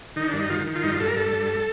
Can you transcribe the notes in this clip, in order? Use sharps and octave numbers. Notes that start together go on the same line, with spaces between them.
D#3 D#4
D4
G2
D#4
D#3 F4
D#3
F4
G2 D#4
F4
G2 A4
A#4
G2 A4
G2